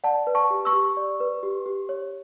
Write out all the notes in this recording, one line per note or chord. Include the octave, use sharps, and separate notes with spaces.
D5 F#5 A5
B4
A5 C#6
G4
C#6 E6
G4
D5
B4
G4
G4
C#5